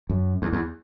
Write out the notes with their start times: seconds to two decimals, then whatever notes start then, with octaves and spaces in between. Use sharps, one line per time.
0.10 F#2
0.42 E2
0.52 E2